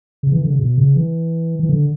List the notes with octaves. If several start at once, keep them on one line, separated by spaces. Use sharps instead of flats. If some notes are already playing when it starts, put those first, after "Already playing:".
C#3
E3
D3
C#3
B2
C#3
E3
E3
D3